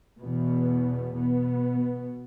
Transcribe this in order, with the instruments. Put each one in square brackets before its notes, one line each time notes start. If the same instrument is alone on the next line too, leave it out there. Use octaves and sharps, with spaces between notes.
[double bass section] E2 B2 B3
B2 B3